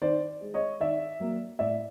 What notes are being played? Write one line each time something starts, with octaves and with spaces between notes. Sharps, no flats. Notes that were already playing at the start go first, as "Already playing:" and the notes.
D#3 C5 D5
G#3
C#5 D#5
D#3 D5 E5
F#3 A#3
A2 D5 E5